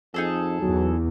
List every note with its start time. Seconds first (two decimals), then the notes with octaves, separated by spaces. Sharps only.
0.14 F2 D#4 G#4 A4
0.62 E2 F#3